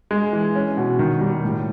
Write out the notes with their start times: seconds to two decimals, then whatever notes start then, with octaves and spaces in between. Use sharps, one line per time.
0.11 G#3
0.33 E3
0.55 C#4
0.77 B2
0.99 D#3
1.21 G3
1.44 A2